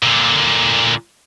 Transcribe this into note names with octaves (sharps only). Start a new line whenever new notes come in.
A#2 D3